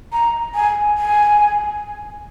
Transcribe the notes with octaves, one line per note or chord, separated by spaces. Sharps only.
A#5
G#5
G#5